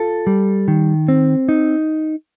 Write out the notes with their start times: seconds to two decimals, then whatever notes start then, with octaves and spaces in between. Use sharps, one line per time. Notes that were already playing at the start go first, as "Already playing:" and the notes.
Already playing: F4 A4
0.27 G3
0.68 D#3
1.08 C4
1.49 D#4